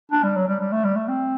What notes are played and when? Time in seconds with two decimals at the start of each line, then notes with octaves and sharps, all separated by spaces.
0.12 D4
0.24 G3
0.36 F#3
0.48 G3
0.60 G3
0.72 A3
0.84 G3
0.96 A3
1.08 C4